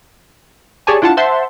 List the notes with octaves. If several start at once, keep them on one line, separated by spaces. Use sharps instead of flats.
G4 G#4 C#5 D5 G#5 A5
D4 E4 F4 F#5 A5
C5 E5 F#5 A5 C6